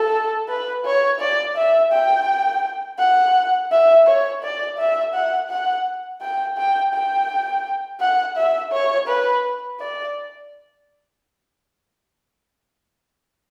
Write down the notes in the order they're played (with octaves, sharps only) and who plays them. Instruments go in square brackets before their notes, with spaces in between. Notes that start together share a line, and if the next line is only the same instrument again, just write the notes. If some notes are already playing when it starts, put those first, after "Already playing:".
Already playing: [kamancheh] A4
B4
C#5
D5
E5
G5
F#5
E5
C#5
D5
E5
F#5
F#5
G5
G5
G5
F#5
E5
C#5
B4
D5